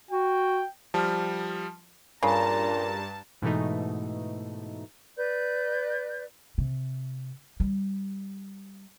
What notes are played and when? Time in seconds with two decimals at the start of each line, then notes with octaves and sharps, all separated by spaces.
0.11 F#4 G5
0.94 F3 G3 A5 F6
2.23 G2 A#2 C#3 A5 A#5
3.42 G#2 B2 E3 A3 D#4
5.17 B4 D5 G6
6.58 C3
7.60 G3